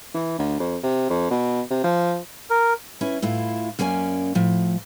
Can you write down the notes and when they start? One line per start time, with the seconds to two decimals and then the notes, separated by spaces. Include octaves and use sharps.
0.15 E3
0.39 D2
0.60 F2
0.84 C3
1.10 F2
1.31 B2
1.71 C3
1.84 F3
2.50 A#4
3.01 C#4 E4 B4
3.22 A2 E4 F4
3.79 F#2 A#3 C#4 D5 G#5
4.35 A2 F3